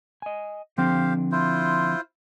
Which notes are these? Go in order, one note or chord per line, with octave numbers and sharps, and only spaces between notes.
D#5 G#5
D3 F3 C4 G4 C5 F5
E4 F4 C5